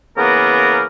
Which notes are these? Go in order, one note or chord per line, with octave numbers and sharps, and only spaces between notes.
C#3 E3 A#3 B3 A#4